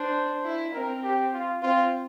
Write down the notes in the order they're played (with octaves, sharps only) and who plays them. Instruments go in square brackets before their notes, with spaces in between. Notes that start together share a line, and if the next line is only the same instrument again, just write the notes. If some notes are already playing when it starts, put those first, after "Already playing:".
Already playing: [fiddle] D4 [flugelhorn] C5
[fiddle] E4
[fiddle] C4 [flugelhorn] A#4
[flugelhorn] G4
F4
[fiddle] C4 [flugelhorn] F4